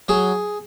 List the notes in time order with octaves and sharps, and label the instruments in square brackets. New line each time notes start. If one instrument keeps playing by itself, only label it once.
[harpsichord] F#3 G#4